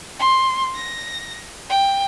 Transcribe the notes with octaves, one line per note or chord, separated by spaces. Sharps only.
C6
A#6
G5